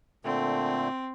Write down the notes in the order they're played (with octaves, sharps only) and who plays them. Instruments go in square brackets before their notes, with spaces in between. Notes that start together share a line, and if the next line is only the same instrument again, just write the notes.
[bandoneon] A#2 D3 A3 [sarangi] C4